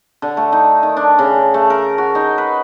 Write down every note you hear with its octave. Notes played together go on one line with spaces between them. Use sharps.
D3
A3
D#4
D#3
D4
C#3
A3
A#4
F#4
D#4
B4